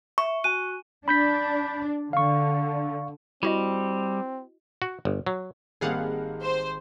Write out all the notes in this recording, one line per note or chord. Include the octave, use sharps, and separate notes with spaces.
E5 C#6
F#4 G#5 D#7
D4 B5 G6 B6
D3 F5 C#6
G3 C4 E4 F#4 D#5
F#4
G1
F#3
G#1 G3 A#3 C4 G#4 F5 F#5 A6
C5